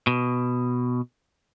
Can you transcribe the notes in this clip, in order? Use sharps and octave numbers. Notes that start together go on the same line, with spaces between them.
B2